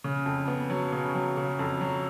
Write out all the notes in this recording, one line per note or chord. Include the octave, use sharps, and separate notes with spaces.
C#3
F2
B3
F#3
C#3
F#3
C#3
F2
F#3